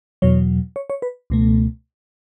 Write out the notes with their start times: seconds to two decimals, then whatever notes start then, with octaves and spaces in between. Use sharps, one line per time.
0.22 E2 B2 F#3 C#5
0.76 C#5
0.90 C#5
1.02 B4
1.30 C#2 B2 A3